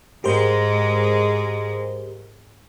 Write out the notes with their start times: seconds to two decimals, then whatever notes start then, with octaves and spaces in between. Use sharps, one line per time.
0.24 G#2 G#3 G4 A#4 C5